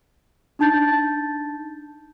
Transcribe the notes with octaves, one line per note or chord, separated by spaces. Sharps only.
D4 D#4 A5 G6 A6